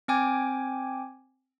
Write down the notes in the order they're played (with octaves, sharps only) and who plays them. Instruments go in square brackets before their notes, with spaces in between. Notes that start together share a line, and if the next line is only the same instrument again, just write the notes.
[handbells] C4 G5 G#5 D6 G#6